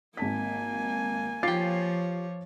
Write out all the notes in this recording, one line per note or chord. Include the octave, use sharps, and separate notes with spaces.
G#1 A#3 G#5 A5 B6
F3 F4 G4 C#5 D6 A6 C7